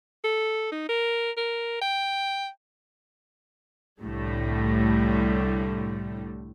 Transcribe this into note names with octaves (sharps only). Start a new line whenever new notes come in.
A4
D#4
A#4
A#4
G5
C2 A2 D3 G3 A3